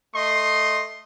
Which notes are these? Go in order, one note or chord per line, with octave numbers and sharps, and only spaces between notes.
A3 D#5 C6